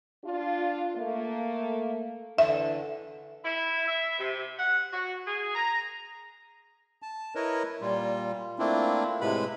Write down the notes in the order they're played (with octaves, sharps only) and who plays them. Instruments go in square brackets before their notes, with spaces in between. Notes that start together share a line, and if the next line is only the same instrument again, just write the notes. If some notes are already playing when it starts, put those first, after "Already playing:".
[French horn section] D4 F4
A3 A#3
[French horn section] D3 E3 [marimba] E5
[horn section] E4
E5
C3
F#5
F#4
G#4
A#5
[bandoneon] A5
E4 A#4 B4 C#5 D#5
A#2 G3 F4
A3 A#3 C4 D4 E4 F4
A2 C3 G#3 B4 B5